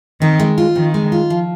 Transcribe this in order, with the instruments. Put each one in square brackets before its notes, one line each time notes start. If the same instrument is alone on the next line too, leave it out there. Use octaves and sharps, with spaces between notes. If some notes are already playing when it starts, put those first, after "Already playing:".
[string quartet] D#3 [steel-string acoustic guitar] C4
[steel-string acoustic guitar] G#3
F4
[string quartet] D#3 [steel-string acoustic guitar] C4
[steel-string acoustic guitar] G#3
F4
F3